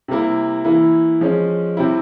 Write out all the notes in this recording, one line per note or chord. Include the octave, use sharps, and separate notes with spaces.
C3 G3 A#3 E4
E3 A#3 E4
F3 G#3 C#4
C3 G3 C4 E4